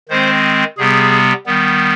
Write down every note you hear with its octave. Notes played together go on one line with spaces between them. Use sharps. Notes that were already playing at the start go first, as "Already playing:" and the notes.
D#3 G#3 C4 C5
C3 G3 B3 G#4
D#3 G3 B3